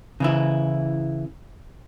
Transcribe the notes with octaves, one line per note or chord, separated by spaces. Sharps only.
C#3 E3 E4